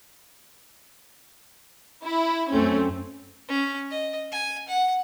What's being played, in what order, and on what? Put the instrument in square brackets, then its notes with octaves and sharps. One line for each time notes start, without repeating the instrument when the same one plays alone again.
[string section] E4
F#2 A3 C4 C#4
[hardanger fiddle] C#4
D#5
G#5
F#5